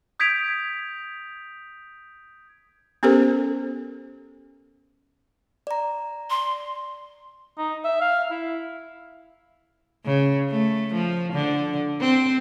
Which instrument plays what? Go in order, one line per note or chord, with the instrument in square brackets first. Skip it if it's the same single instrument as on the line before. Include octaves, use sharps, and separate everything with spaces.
[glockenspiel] D#6 G6 G#6 B6 D7 F7
[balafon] B3 C#4 G4 A4 A#4 C5
[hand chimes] D5 A#5
[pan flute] C6
[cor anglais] D#4
E5
F5
E4
[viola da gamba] C#3
A3
F3
D3
C4